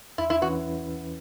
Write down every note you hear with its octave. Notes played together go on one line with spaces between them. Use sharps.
E2 E4
E4
E3 C#4 E4 F#4 B4